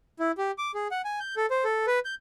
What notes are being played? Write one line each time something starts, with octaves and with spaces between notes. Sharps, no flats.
E4
G4
D6
G#4
F#5
G#5
G6
A4
C5
A4
B4
G6